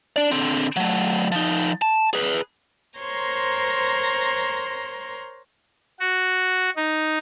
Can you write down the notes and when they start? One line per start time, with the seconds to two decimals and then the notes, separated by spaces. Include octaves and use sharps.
0.16 D4 D5
0.32 D3 C4
0.76 F#3 A3
1.32 F3 D#4
1.82 A5
2.13 G#4 B4
2.99 A#4 C5 C#5 A#5 C6
6.00 F#4
6.76 D#4